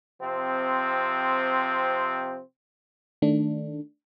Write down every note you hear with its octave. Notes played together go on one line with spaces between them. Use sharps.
C3 F3 C4
D#3 A3 D4